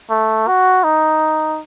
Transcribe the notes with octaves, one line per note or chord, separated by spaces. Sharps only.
A3
F#4
D#4